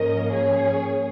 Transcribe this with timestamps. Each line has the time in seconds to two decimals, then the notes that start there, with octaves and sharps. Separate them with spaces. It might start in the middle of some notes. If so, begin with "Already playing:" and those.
Already playing: G#2 F3 A#3 C#4 A#4 D#5
0.32 G#4 C#5